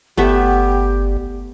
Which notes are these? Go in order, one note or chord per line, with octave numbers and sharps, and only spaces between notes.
G1 A3 B3 G4 E5